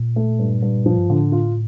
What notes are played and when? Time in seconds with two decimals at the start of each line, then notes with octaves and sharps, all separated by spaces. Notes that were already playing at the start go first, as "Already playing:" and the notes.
Already playing: A#2
0.16 A3
0.39 G2
0.62 G2
0.86 F3
0.98 G2
1.09 A2 D3
1.32 F4